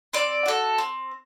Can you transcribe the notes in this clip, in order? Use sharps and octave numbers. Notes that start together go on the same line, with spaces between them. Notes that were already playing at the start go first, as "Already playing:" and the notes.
C4 D5
F#4 A4
C4